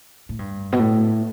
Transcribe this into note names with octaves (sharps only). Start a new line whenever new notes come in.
A2
G2
B2
A2